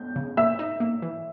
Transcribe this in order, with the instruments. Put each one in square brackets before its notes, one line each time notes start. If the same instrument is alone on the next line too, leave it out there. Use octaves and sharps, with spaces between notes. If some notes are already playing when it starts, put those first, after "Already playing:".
Already playing: [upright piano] G6
[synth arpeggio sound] C#3
[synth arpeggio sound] A#3 [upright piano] E5 E6
[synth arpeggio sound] D#4
A#3
E3